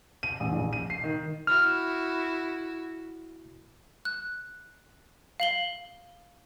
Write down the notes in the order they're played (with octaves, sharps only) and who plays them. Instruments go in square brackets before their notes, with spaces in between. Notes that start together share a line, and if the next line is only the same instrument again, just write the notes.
[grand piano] D#7
A1
A#1
D#7
C7
D#3
[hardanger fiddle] E4 F#4 [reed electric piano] F6
[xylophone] F#6
F5 F#7 G7